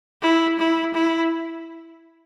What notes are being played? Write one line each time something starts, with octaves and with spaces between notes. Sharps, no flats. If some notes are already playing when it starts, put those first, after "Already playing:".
E4
E4
E4